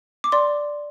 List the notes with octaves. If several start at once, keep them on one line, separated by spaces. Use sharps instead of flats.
D6
D5 C6